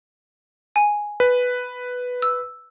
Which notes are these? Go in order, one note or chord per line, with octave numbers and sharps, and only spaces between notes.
G#5
B4
E6